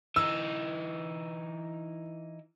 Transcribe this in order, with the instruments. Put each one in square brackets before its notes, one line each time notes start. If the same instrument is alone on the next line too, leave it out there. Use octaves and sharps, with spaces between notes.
[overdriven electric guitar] E3 D#4 [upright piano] E6